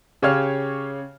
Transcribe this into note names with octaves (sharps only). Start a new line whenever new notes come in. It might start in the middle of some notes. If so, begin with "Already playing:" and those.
C#3 G4 C#5 F5 F6